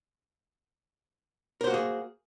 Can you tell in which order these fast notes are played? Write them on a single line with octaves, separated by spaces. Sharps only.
A#4 C5 F#4 A#3 G#4